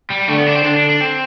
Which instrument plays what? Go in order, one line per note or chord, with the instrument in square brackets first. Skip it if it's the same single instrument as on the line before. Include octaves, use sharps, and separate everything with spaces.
[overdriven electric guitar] G3
[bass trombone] D3 [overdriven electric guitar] A3
[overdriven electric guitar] B3
D4
C4
[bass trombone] D3 [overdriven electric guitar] D4
[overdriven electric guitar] D4
D4
C4